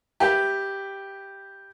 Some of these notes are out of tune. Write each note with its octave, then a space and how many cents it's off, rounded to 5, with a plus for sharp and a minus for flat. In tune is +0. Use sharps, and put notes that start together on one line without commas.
G4 +0 B4 +0 E5 +0